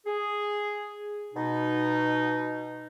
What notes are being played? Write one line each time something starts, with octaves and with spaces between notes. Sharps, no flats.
G#4
B2 D#4